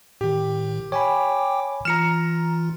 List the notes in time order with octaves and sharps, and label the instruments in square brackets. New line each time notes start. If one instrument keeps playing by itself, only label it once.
[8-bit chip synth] A2 D#3 [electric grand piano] G4
[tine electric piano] C#5 G#5 B5 [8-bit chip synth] G5 D6
[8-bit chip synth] E3 F4 [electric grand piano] A#5 C#7 E7 [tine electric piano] F6